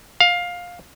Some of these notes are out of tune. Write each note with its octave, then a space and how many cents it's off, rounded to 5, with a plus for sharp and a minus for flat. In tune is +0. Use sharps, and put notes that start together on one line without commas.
F5 +15